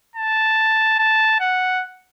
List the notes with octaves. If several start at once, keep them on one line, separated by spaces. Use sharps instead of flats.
A5
A5
F#5